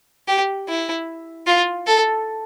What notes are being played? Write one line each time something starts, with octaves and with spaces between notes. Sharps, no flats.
G4
E4
F4
A4